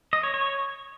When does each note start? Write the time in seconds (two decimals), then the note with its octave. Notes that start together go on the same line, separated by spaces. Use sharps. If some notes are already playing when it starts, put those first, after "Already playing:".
0.13 D#5
0.23 C#5
0.34 C#5